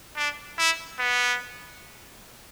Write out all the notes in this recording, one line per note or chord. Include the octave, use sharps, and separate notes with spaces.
D4
E4
B3